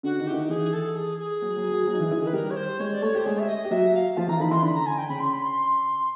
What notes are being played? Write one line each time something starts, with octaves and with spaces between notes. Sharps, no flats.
D3 D4 F#4
D#3 D#4
E4 G4
D#3 D#4
E3 E4 G#4
A4
G#4
G#4
F#3 F#4
F#3 F#4
F#3 F#4
F#3 F#4
D#4
E3 E4
E3 E4
D#3 D#4
B4
G3 G4 A#4
C#5
C5
G#3 G#4 C#5
D5
A3 A4 C#5
G4 C5
G#3 G#4 C#5
E5
D#5
G4
F#3 F#4 E5
F5
F3 F4 A5
E3 E4 A#5
D#3 D#4 B5
E3 E4 C6
D3 D4 B5
A#5
G#5
G5
C#3 C#4 B5
C6
B5
C6